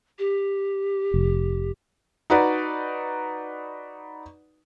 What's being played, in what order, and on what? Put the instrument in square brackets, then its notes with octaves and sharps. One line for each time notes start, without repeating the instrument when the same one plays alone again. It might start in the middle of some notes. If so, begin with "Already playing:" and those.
[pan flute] G4
[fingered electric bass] F1
[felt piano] D#4 F#4 B4 D5